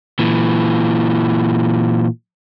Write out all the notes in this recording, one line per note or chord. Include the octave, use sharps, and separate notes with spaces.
A#2 E3